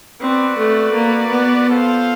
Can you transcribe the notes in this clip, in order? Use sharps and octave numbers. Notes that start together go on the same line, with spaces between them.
C4 F#4 B4 D5
A3
A#3
B3
F4 A4 C5 F5